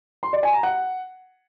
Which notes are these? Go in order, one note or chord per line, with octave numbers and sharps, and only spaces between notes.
C6
D5
G#5
A#5
F#5